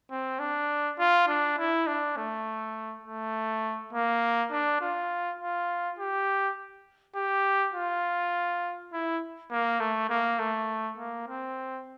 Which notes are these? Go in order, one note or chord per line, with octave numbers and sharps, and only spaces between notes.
C4
D4
F4
D4
E4
D4
A3
A3
A#3
D4
F4
F4
G4
G4
F4
E4
A#3
A3
A#3
A3
A#3
C4